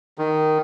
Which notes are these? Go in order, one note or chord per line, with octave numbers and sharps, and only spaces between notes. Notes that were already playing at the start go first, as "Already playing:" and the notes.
D#3